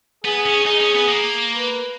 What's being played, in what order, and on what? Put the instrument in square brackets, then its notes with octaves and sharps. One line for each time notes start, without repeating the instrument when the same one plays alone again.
[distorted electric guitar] B3 [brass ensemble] G#4
[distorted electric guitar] C#4
[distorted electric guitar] D#4 [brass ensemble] G#4
[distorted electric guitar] C#4
B3
A#3
[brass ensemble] B4